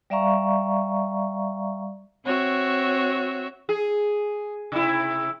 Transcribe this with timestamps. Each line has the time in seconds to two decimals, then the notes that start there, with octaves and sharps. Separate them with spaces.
0.10 G3 D5 E5 F5 A#5 C#6
2.24 C4 F#4 C#5 E5
3.69 G#4
4.72 C3 E4